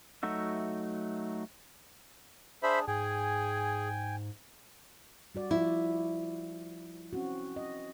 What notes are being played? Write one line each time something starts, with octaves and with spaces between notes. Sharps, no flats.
F#3 A3 D#4 F#4 E5
D4 G#4 C5 E5 B5
G#2 G#4 G5 G#5
G3 F#4 D5
F3 E4 F4
C4 C#4 F#4
D#5